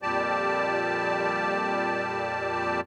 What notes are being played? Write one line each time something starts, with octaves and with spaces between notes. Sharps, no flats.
F2 A#2 G3 G4 D5 A5